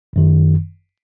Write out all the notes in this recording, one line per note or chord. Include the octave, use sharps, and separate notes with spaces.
G1 F#2 D#3